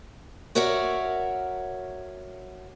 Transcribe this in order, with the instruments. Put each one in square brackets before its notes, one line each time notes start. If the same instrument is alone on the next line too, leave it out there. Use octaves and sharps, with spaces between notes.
[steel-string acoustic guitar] F#4 A#4 C#5 D5 E5 F#5